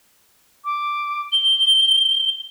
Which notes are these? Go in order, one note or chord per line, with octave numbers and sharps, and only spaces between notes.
D6
G7